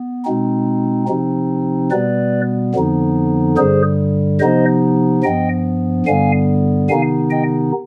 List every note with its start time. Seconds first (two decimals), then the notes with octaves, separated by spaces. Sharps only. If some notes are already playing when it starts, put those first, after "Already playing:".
Already playing: B3
0.25 B2 G#3 C4 D#4
1.08 C3 F3 C4 D#4
1.91 B2 G3 B3 B4 D5
2.74 F2 D3 F3 B3 D#4
3.57 G2 D3 G3 G#4 C5
4.40 C3 F3 B3 D#4 C5 D#5
5.23 G2 F3 B3 D#5 G5
6.06 G2 D3 G3 B3 F5 G#5
6.89 C3 D#3 B3 D#4 F5 G#5
7.30 D#5 G5